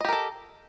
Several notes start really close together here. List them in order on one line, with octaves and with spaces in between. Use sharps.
D#5 G4 A#4 A4